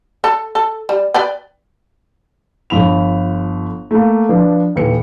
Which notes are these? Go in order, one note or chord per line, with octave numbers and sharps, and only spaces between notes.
A4
A4
G3
B4 D5 G5
G1 F3 B5 F7
A3 A#3
F3 D4 B4
D#1 E3 C#7